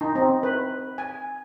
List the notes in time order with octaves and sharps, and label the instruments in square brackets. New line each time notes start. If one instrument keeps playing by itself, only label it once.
[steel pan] D#4
C4
B4
G#5